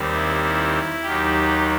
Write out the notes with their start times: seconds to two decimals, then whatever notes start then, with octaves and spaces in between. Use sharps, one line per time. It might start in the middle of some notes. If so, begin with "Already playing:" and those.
Already playing: D#2 D#3 G3 C4
0.13 E4
0.43 E4
1.03 D#2 D#3 F#3 G4